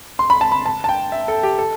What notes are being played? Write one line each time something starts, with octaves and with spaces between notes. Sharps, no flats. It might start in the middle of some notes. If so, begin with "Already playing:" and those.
C6
B5
A5
B5
A5
A5
G5
E5
A4
G4
A4